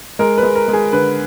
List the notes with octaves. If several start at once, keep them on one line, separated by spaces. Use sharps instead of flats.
G#3 A#4
B4
G#3
A#4
G#3
G#4
D3 B4